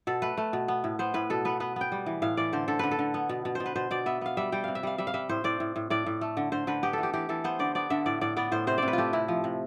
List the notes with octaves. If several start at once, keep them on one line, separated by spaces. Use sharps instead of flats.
B2 A4
A3 B4
A3
B2
B3
A2
B3 C5
A2 B4
B2 A4
B3 B4
B3 B4
B3 G5
G3
E3
A2 F5
E3 D5
D3 C5
D3 A4
D3 B4
A4
D3
B3
B2
B2
B2 C5
B4
B2 C5
B2 D5
B3 E5
B3 F5
G3 E5
G3 G5
C3 F5
E5
G3 F5
G3 E5
F5
G3 E5
A2 C5
A2 D5
A2
A2
A2 D5
A2
A3
D3
D3 C5
D3 B4
B3 G4
E3 A4
G4
E3 G4
E3 A4
B3 C5
D3 D5
B3 D5
D3 E5
A2 D5
A2 D5
B3 D5
A2 C5
C3 C5
C3 D5
B4
A3 F4 G4
C3 E4
F3
C3